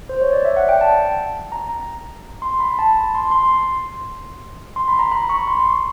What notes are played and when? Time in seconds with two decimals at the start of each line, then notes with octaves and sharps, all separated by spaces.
0.09 C5
0.21 C#5
0.33 D5
0.45 E5
0.57 F#5
0.69 G5
0.81 A5
1.52 A#5
2.42 C6
2.60 B5
2.79 A5
3.15 C6
3.31 C6
4.76 C6
4.88 B5
4.99 A#5
5.12 B5
5.29 C#6
5.47 C6